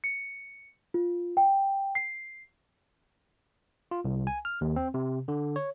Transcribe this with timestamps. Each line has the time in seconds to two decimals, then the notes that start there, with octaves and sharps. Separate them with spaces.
0.04 C#7
0.94 F4
1.37 G5
1.95 C7
3.91 F4
4.05 C2
4.27 G#5
4.45 F6
4.61 D#2
4.76 C4
4.94 C3
5.28 D3
5.56 C#5